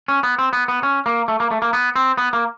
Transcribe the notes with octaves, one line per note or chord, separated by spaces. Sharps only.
C#4
B3
C4
B3
B3
C#4
A#3
A3
A#3
A3
A#3
B3
C4
B3
A#3